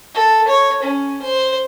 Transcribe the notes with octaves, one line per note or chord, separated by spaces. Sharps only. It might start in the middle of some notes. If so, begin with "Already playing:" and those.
A4
C#5
C#4
C5